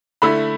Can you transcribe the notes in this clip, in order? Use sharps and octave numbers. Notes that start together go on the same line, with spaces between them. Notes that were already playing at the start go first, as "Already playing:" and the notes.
D3 A3 E4 B5